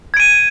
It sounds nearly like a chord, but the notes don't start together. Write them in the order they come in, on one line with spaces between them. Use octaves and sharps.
G#6 D7 D#7